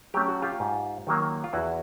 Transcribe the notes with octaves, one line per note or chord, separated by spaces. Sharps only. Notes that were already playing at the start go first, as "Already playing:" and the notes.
F#3 A3 C#4 G4
F#4
F4 G4
G#2
D#3 F#3 A#3
F4
E2 E4 F#4